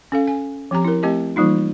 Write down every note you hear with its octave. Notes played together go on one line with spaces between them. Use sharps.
C#4 A4 F5
G#5
F3 C4 G4 A#5
E4 A#4
A3 C4 G4 D#5 A5
E3 G3 A#3 D#4 F4